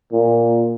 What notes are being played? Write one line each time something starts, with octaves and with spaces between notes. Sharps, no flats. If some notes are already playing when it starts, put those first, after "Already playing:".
A#2